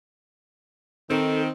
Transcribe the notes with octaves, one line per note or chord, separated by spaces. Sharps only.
D#3 C4 D#4 A4